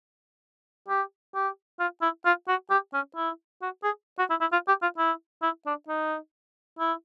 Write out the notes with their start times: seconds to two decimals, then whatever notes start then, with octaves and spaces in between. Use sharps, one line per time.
0.88 G4
1.35 G4
1.80 F4
2.02 E4
2.25 F4
2.48 F#4
2.70 G4
2.93 C#4
3.16 E4
3.62 F#4
3.84 G#4
4.19 F#4
4.30 E4
4.41 E4
4.52 F4
4.68 G4
4.82 F4
4.98 E4
5.43 E4
5.66 D4
5.88 D#4
6.79 E4